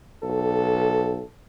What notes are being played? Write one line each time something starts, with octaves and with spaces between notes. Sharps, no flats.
B1 A4